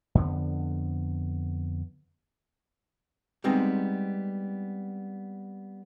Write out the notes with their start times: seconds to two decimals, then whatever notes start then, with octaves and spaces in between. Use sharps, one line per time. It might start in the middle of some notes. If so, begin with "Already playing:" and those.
0.15 F2 D3 B3
3.44 G3 G#3 B3 C4 D#4